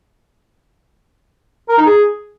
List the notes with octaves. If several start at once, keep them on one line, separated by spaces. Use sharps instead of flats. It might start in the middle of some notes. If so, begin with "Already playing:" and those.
A#4
D#4
G#4